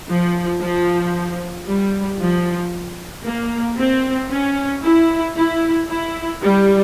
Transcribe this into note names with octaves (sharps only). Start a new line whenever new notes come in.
F3
F3
G3
F3
A#3
C4
C#4
E4
E4
E4
G3